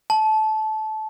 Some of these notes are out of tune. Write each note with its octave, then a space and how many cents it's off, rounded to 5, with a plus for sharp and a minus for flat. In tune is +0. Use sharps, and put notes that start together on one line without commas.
A5 -20